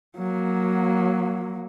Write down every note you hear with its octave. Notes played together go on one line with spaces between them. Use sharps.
F#3 A#3